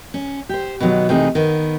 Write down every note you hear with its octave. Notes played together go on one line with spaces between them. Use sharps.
C#4
G4 C5
B2 D#3 F#3 B3
C3 E3 A3 D#4 G#4
D#3 B3